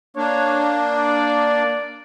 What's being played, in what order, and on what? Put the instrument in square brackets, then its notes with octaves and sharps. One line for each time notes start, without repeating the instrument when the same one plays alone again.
[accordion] A#3 D4 [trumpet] C#5
[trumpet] D5